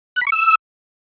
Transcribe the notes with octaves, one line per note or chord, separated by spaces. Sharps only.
F#6
B5
C#6
E6